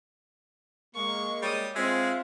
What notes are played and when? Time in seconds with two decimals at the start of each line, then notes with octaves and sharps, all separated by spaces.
0.95 G#3 A#3 C#6
1.42 G3 C#5 D#6
1.76 G#3 C4 F4 E5